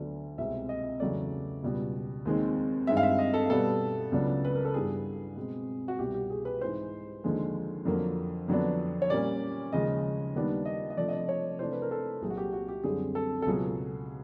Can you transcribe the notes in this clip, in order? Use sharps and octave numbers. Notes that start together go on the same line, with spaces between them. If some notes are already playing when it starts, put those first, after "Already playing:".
Already playing: D2 D3 F#3 B3 D4
C2 B2 G#3 C4 E5
D#5
E2 C#3 F#3 A3 D5
C#2 B2 G3
D#2 D#3 G#3 C4
G2 D#3 G#3 C4 E5
F5
E5
D#5
A4
B2 G3 B3 A4
C#2 C#3 F#3 B3 D4
B4
A#4
A4
G2 E3 G3 B3 G#4
B2 G#3 C4
F#4
C2 B2 G3 G4
G4
G#4
B4
G#2 E3 G#3 C5
D#2 D3 F3 G#3
F2 D3 F#3 A#3
F2 D3 F#3 B3 D4
C#5
A#2 G3 A#3 C#4 D5
D#2 C#3 F3 G#3 D#5
D#2 D#3 G3 B3 D4
D#5
D#5
C3 F3 A3 D4 D5
D#5
D5
C#5
C3 E3 A3 D4 C5
B4
A#4
A4
C2 A#2 F#3 G#4
F#4
G4
F#4
G4
F#2 D3 G3 C4 G#4
A4
A4
C#2 B2 F#3 B3 G#4